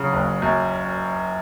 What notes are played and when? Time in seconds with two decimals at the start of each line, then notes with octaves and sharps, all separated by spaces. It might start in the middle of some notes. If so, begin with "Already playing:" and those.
Already playing: C#3 F#3
0.13 F#1
0.42 F#2